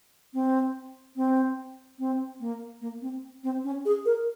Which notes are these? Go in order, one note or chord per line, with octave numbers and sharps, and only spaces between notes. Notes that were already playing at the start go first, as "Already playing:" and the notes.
C4
C4
C4
A#3
A#3
C4
C4
C#4
G#4
A#4